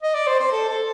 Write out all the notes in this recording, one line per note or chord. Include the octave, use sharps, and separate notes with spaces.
D#5
D5
C5
C5
A4
A4